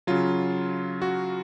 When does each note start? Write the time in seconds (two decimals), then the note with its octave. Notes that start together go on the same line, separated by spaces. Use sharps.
0.07 C#3 F#3 F4
1.02 F#4